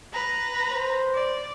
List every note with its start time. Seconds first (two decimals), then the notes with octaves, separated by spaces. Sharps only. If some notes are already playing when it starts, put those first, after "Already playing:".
0.13 B4 A#5
0.71 C5
1.14 D5